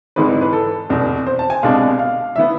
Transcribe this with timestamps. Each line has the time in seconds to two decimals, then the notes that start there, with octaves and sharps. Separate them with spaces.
0.16 G#1 G#2 E3 G#3 B4
0.41 B4
0.53 A4
0.89 F1 E2 B2
1.27 C5
1.39 A5
1.50 G#5
1.63 C2 B2 G#3 D4 F5
1.99 F5
2.36 E3 B3 E5